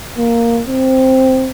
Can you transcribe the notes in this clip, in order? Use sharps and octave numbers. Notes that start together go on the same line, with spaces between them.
A#3
C4